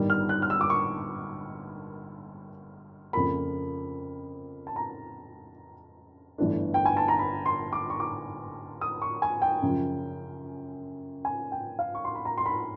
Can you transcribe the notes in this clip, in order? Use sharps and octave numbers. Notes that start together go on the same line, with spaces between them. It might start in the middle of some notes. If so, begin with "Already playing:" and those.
Already playing: G1 G2 D#3 G3
F6
F#6
F6
E6
D6
C#6
F2 C#3 F3 A#3 B5
A5
A#5
G1 G2 E3 A3 D4
G5
G#5
A5
A#5
B5
C6
D6
C#6
D6
D#6
C#6
G#5
G5
F#2 C#3 F3
G#5
G5
F5
C#6
C6
B5
A#5
C6
B5